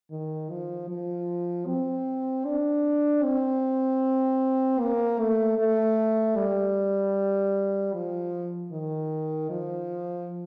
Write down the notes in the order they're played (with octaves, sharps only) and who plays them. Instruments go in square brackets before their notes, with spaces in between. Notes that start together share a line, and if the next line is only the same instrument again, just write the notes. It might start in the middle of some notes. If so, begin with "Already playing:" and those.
[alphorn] D#3
F3
F3
C4
D4
C4
A#3
A3
A3
G3
F3
D#3
F3